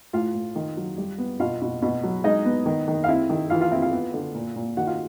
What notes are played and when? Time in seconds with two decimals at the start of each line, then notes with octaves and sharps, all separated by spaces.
0.13 A2 F4 F5
0.35 A2
0.55 D#3
0.77 F#3
0.98 G3
1.18 B3
1.40 B2 F4 F5
1.62 B2
1.82 B2
2.03 F#3
2.24 G#3 D#4 D#5
2.45 B3
2.66 D#3
2.88 D#3
3.04 F5
3.08 C4 E4 E5
3.29 D#3
3.50 E3 F4 F5
3.61 F4 F5
3.71 C4 E4 E5
3.82 F4 F5
3.93 B3
4.14 D3
4.34 A#2
4.56 A#2
4.77 D#3 F#4 F#5
4.87 F4 F5